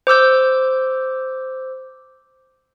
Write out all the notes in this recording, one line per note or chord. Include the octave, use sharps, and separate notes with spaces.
C5 D6 E6 G6